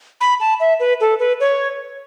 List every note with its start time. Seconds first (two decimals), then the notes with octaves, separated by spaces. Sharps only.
0.21 B5
0.40 A5
0.60 E5
0.80 B4
1.01 A4
1.19 B4
1.40 C#5